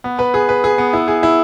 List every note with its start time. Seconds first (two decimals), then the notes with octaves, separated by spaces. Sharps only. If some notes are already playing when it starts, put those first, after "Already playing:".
0.04 B3
0.19 B4
0.34 G#4
0.49 B4
0.64 G#4
0.78 B3
0.93 E4
1.08 G#4
1.23 E4